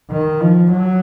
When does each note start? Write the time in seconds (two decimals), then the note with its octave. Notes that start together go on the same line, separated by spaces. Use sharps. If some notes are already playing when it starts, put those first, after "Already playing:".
0.10 D#3
0.41 F3
0.71 F#3